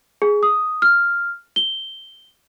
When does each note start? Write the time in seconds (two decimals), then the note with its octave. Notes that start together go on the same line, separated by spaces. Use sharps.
0.22 G#4
0.43 D#6
0.82 F6
1.56 G7